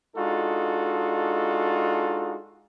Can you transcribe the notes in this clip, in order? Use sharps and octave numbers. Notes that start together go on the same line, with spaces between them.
G#3 D4 D#4 F4 F#4 A4